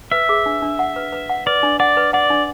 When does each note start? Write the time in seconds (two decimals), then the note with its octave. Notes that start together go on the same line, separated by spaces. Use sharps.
0.12 B4 E5
0.29 G#4
0.46 D4
0.62 D4
0.79 F#5
0.96 B4
1.13 B4
1.30 F#5
1.46 B4 D5
1.63 D4
1.80 D5 F#5
1.97 B4
2.13 D5 F#5
2.30 D4